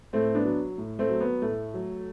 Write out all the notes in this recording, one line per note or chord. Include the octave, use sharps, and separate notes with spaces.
A2 A3 C4
B3 D4
F#3
A2
A3 C4
F#3
B3
A2 A3
F#3